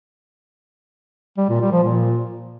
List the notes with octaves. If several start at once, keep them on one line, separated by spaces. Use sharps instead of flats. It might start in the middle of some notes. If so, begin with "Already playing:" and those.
G3
A#2
G3
F3
A#2